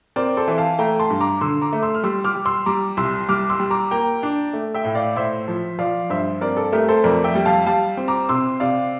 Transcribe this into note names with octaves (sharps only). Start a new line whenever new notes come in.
C4 A#4 D5
A4 C5
E3
F5 A5
A3 G5 A#5
A5 C6
G2
A#5 D6
D3 C6 E6
A#5 D6
A3
C6 E6
F6
G3 C6 E6
D6 F6
G3
C6 E6
G3 A#5 D6
C2 C6 E6
G3 D6 F6
C6 E6
G3
A#5 D6
A#3 G5 A#5
D4
A3
E5 G5
A2
D5 F5
A2 C5 E5
F3
F3 D5 F5
G2 C5 E5
C4 A#4 D5
A4
A3 G4 A#4
A4 C5
F2 A#4 D5
E5 G5
G3
F5 A5
G3 F5 A5
C4
A#5 D6
C3 C6 E6
C3 D5 F5